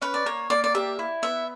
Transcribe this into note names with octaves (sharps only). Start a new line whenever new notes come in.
C#4 B4
D5
A#3 C#5
A#3 D5
D5
G4 E5
E4
B3 E5